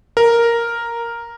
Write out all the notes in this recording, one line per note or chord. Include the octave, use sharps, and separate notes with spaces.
A#4